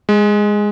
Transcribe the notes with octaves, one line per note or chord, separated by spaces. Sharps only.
G#3